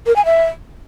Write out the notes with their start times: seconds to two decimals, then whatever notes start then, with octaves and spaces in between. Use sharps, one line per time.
0.07 A#4
0.16 G#5
0.25 E5